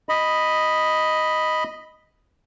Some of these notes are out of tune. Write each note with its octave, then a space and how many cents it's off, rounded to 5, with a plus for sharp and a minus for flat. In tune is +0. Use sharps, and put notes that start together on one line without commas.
D#5 +0 B5 +0